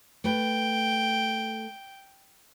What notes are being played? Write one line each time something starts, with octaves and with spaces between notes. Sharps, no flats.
A3 B4 G5